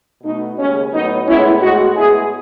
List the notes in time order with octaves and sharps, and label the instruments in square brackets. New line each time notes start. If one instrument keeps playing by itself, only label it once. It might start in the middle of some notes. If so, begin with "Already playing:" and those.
[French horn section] B2 A3 D#4
D#2 C#3 G#3 C#4
A2 F#3 B3 D#4
A2 G#3 B3 C#4 E4
A2 G#3 B3 D#4 F#4
A2 G#3 B3 E4 G#4